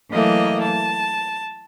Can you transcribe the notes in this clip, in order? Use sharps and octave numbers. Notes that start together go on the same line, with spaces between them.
E3 F#3 A3 A#3 D#5
A5